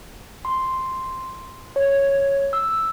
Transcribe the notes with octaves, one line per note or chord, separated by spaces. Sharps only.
C6
C#5
E6